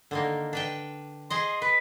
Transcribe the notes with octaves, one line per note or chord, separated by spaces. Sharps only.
D3 D#3 A#3
D4 B4 G5
G#4 C5 D#5 C6
B4 B5